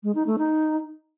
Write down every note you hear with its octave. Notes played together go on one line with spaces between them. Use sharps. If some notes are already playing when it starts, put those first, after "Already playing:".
G#3
D#4
A3
D#4